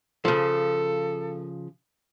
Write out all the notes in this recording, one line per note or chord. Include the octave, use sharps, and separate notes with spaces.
C#3 F3 A4